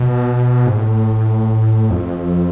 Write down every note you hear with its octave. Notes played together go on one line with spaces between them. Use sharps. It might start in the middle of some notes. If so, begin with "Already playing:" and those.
Already playing: B2
G#2
A2
F2